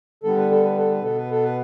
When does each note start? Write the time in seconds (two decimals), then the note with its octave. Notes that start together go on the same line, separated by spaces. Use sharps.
0.23 D3 G3 B3 A4
0.37 B4
0.51 A4
0.63 B4
0.78 A4
0.90 B4
0.99 B2 B3 A4
1.16 B4
1.31 A4
1.43 B4